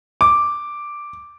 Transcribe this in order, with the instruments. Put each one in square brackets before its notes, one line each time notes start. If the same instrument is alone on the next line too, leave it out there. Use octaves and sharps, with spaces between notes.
[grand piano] D6